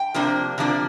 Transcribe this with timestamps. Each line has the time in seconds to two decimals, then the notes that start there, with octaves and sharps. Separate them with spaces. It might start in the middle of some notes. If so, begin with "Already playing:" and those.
Already playing: G5
0.14 C3 F3 A#3 D4
0.58 C3 F3 A#3 D4